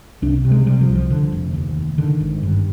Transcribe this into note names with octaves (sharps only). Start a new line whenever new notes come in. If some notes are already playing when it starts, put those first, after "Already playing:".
C2 D4
C3
G#3
C3 G3
F3
C2
F3
D3
F1
D#2
F1
D3 D#3
G#1
G2